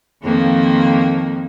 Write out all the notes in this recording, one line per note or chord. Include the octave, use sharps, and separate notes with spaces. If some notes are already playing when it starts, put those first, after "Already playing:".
F2 D#3 A#3